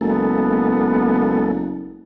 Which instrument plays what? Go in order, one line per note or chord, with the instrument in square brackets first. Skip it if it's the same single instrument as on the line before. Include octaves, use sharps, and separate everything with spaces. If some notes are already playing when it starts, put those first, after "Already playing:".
[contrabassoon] F#1 [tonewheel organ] G#3 A#3 A4 [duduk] B3